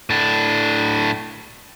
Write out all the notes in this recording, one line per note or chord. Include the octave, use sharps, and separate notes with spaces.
A2 D4